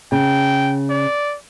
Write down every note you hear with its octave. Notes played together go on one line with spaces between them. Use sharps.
C#3 G5
D5